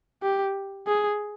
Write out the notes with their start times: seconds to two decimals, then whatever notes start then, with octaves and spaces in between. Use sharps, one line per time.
0.23 G4
0.87 G#4